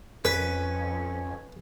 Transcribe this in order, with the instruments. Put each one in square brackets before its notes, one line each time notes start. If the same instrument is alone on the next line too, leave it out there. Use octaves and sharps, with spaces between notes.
[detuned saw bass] F2 [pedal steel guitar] C#4 [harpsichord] B4